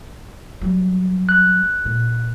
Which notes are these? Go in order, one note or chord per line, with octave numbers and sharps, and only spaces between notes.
F#3 G3
F#6
A#2